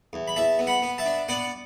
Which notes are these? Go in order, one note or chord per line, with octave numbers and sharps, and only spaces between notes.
E2
B5
E2 E5 A5
B3
F#5 B5
B3
E5 A5
D4
B3 D5 F#5